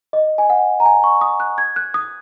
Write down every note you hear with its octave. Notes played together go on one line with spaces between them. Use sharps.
D#5
G#5
F#5
A#5
G#5
C#6
D#6
F#6
G#6
F#6
D#6